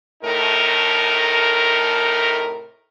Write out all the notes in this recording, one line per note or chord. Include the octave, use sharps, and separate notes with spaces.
A2 C3 A3 D#4 A#4